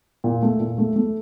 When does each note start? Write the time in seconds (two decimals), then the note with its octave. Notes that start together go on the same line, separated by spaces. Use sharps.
0.24 A#2
0.42 A3
0.60 A#2
0.78 A3
0.96 A3